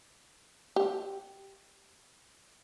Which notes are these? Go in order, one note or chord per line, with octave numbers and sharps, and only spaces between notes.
G4